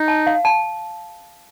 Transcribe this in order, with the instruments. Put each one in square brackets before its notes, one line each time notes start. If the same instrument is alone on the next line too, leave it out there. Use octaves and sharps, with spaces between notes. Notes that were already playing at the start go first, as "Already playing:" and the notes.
Already playing: [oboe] D#4
[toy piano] A5
F5
A5